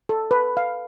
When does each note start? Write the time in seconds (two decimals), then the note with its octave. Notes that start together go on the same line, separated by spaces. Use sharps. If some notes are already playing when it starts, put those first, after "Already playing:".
0.09 A4
0.31 B4
0.57 F5